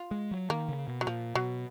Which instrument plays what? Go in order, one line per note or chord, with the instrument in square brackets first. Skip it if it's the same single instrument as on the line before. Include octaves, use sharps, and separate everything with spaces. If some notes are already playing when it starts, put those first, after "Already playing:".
Already playing: [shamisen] F4
[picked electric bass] G#3
F#3
[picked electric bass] D#3 [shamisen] A#3
[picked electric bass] C#3
B2
[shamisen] F#3
[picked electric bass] A#2 [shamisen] F3
[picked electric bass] B2 [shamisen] F#3